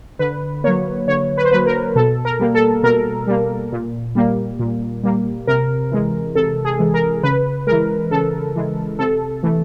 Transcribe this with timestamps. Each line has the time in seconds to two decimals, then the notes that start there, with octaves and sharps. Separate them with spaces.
0.19 D3 B4
0.64 F#3 A#3 C#5
1.08 D3 C#5
1.38 B4
1.45 C5
1.51 F#3 A#3 B4
1.66 A#4
1.95 B2 A4
2.25 A#4
2.40 G3 A#3
2.54 A4
2.83 B2 A#4
3.27 G3 A#3
3.72 A#2
4.15 G3 A#3
4.59 A#2
5.04 G3 A#3
5.47 C3 A#4
5.91 E3 G#3
6.35 C3 A4
6.65 G#4
6.79 E3 G#3
6.94 A#4
7.23 C#3 B4
7.67 E3 G#3 A#4
8.11 C#3 A4
8.56 E3 G#3
8.99 C3 A4
9.43 E3 A3